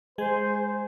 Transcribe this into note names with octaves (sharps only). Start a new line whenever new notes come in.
G#3 C5 G#5